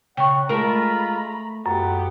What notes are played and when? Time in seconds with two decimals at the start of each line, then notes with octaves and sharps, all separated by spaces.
0.17 C#3 C#5 F#5 G5 C#6
0.49 G#3 A3 F4 A#4 A#5 B5
1.66 F#2 A#2 A3 B3 G4 F#5